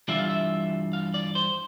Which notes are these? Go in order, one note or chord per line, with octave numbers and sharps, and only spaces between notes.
G2 E3 G3 D4 F4 E5
F5
E5
F5
D5
C5